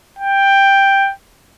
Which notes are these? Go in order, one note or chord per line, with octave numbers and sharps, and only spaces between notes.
G5